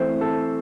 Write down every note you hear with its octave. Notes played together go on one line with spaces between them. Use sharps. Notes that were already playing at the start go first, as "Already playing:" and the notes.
Already playing: E3 A3 C4 C5
A4